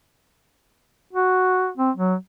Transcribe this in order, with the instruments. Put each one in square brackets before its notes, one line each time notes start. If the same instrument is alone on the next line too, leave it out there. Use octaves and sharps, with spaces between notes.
[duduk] F#4
C4
F#3